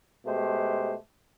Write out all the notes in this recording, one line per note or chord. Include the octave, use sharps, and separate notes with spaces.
B2 G#3 A3 G4 C5